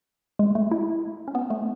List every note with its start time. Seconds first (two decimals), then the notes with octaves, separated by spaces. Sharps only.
0.39 G#3
0.55 A3
0.71 E4
1.28 C#4
1.35 B3
1.50 A3